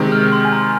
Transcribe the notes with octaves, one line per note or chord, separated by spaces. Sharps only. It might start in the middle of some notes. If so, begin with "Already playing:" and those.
Already playing: C3 D#3 G#3 C4
F6
C6
G#5
A#5